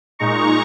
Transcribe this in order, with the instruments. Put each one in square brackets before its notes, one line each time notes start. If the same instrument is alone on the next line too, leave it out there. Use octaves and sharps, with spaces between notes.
[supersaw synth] A#2 G#3 D#4 A#5 C#6